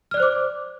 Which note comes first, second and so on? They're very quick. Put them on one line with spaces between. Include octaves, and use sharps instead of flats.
F6 D5 F#6 C5 D6